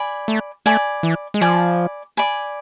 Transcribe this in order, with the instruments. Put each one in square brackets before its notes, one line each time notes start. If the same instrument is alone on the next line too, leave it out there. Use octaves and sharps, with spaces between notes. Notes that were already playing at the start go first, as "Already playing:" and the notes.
Already playing: [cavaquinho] D5 G#5 B5
[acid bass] A3
[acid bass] A3 [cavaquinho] D5 G#5 B5
[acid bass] E3
G#3
[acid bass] F3 [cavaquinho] D5 G#5 B5
[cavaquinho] D5 G#5 B5